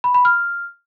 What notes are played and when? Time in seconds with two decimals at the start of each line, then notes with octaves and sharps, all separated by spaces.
0.04 B5
0.14 B5
0.25 F6